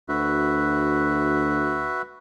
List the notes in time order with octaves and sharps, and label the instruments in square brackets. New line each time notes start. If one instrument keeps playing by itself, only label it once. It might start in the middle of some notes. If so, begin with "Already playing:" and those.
[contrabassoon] D2 [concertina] F#4 B4 E5